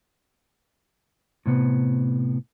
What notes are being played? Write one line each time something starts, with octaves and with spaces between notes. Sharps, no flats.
A2 C3 B3